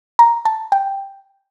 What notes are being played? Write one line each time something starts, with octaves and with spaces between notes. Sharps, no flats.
A#5
A5
G5